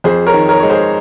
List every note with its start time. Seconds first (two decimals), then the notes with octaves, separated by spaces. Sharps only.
0.04 F2 G#4 C5
0.26 A#4 C#5
0.34 D#3
0.49 A#4 C#5
0.60 G#3 C#5
0.70 G#4 C5